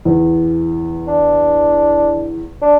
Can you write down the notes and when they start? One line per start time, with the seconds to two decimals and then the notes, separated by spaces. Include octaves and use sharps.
0.05 E2
1.08 D4
2.62 D4